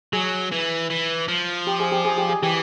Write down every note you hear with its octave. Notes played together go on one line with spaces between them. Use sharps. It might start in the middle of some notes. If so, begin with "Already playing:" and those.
F#3 G#4
E3
E3
F3
G4
G#4
G4
G#4
G4
G#4
E3 G4